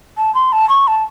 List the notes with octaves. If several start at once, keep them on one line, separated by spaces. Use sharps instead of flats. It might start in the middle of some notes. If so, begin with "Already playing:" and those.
A5
C6
A5
C#6
A5